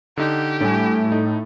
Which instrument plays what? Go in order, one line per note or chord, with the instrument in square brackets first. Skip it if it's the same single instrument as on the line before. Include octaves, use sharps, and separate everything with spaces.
[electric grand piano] D3 D#4 [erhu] G4
[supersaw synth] A2 [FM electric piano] G3 D4 [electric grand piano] A3 G#5
[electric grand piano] D#4